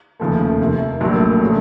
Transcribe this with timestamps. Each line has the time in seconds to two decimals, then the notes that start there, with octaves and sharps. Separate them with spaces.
0.20 F1 D#2 C#3 F3 A3
0.60 F2 C3 D#3
1.00 A#1 A2 F#3 A#3
1.41 C#3 F#3 A3 C#4